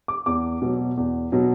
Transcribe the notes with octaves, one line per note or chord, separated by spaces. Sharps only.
D6
E2 D6
B2 F#3
E2
B2 F#3